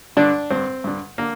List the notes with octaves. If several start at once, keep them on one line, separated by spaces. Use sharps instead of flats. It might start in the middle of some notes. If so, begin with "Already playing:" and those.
G2 D3 D4
G2 D3 C4
G2 D3
D3 A#3